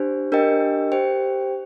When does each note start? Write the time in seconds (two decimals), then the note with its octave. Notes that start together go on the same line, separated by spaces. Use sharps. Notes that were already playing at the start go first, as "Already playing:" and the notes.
Already playing: D4 G4 C5
0.32 D4 G4 A#4 D#5 G5
0.92 G4 C5 G5